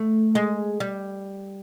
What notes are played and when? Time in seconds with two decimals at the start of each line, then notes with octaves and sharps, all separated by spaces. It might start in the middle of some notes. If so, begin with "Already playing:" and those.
Already playing: A3
0.35 G#3
0.80 G3